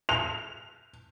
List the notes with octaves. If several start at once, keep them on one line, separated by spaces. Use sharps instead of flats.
F7